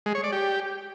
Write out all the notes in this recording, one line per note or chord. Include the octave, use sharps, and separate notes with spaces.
G#3
C#5
D5
G4